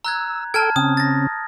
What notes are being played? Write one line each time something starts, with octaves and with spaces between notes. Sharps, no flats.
A#5 E6 F#6 G#6
A4 G5 A5 F6 G#6
C#3 C4 C#4 D#6
A6 A#6